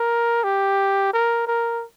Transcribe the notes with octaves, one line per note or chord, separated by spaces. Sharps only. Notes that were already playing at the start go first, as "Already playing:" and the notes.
Already playing: A#4
G4
A#4
A#4